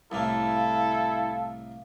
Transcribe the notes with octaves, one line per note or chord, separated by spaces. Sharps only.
C2 A2 A#3 E4 A4 F5